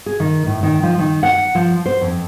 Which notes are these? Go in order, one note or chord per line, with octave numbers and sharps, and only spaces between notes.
G#4
D#3
A2
D#3
F3
D#3
F#5
F3
C5
F2